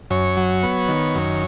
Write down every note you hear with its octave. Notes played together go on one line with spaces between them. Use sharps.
F#2 C#5
F#3
B3
D#3
F#2